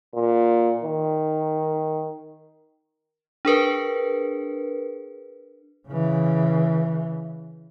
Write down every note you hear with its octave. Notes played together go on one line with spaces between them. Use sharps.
A#2
D#3
D4 G#4 A#4 B4
C#3 E3